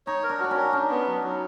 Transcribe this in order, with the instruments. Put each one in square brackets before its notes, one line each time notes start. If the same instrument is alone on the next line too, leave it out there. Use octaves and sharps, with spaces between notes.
[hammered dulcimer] D#4 [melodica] C#5
[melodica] A#4
[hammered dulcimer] D4
[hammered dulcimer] D4 [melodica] F#4
[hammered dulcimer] C#4
[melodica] A#4
[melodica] D4 [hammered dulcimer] D#4
[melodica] B3
F#3
F#3